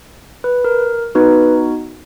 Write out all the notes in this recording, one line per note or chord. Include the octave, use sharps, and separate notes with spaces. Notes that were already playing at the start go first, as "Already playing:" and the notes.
B4
A#4
B3 D#4 F#4 B4